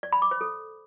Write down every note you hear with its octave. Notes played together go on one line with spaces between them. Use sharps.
D5
B5
D6
C5
A4